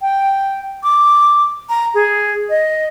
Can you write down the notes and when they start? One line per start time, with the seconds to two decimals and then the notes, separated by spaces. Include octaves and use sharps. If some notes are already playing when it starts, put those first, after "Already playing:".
0.02 G5
0.83 D6
1.69 A#5
1.94 G#4
2.49 D#5